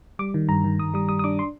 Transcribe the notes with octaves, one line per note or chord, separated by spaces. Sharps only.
G3 D6
D#3
G2 A#5
D#3
G2 D#6
G3 D#6
G3 D#6
D#6
D4 D6
C6